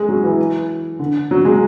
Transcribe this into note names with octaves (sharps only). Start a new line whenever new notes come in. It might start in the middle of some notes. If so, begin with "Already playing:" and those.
Already playing: G#3
F#3
E3
D3
F#3
G#3